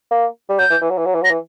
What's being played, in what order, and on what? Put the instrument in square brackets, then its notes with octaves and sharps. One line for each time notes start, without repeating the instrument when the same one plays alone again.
[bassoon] A#3
G3
[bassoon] F#3 [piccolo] G6
[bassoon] E3
E3
F#3
E3
F#3
E3
[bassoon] F#3 [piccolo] A#6
[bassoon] E3